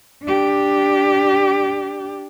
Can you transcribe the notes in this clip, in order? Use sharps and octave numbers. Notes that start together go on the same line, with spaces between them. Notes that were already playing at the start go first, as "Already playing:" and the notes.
D4 G4